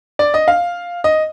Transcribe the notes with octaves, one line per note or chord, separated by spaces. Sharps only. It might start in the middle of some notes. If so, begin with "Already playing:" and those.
D5
D#5
F5
D#5